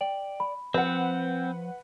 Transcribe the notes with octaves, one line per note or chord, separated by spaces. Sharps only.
D5 G5
B5
F3 C4 B4 F#5